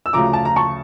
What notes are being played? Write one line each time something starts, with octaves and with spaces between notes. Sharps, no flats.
E6
D2 C#3 F3 A#5 D6
A5
A#5
A5 C#6